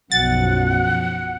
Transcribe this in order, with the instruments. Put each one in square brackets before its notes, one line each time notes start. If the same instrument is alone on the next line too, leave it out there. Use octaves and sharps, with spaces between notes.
[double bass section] B1 F#2 F3 [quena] F#5 [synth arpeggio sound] A6